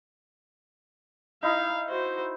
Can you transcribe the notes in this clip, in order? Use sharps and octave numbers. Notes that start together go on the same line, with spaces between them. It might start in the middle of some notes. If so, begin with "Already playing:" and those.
D#4 E4 F5
F#4 C5